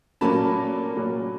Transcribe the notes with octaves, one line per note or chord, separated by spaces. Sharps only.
A#2 F#3 A#3 C#4 A5 B5
A#2 F#3 A#3 C#4